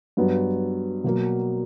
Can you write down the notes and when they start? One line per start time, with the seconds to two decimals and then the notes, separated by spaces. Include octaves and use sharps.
0.17 G2 F#3 B3
1.04 B2 F#3 A#3